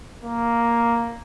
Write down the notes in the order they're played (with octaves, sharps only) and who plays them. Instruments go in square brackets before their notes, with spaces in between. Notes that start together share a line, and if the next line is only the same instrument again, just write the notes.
[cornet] A#3